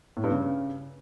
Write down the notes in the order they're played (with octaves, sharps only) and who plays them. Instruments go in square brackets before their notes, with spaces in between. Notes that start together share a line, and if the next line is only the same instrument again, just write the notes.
[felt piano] A2
G2
C#3